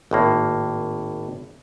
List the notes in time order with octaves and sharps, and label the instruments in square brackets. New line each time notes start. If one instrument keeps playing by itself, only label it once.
[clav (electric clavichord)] G#1 A2 A#3